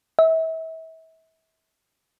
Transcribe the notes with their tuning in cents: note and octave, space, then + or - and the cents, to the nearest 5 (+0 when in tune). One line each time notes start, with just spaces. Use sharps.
E5 -35